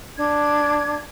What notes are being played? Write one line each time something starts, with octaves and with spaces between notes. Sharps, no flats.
D4 G#6